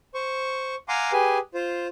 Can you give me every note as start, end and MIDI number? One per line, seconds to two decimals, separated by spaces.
0.14 0.75 72
0.14 0.75 85
0.89 1.12 77
0.89 1.12 78
0.89 1.12 80
0.89 1.12 82
0.89 1.12 84
0.89 1.12 86
1.12 1.38 67
1.12 1.38 68
1.12 1.38 71
1.12 1.38 80
1.54 1.87 65
1.54 1.87 72